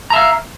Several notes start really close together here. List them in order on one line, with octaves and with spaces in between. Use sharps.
A#5 E5 F5